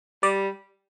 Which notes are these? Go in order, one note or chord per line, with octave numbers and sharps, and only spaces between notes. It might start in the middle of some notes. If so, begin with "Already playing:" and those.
G3 D5